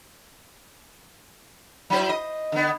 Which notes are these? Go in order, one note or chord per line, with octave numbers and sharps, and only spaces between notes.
F#3 E4 C5
D#5
D3 B3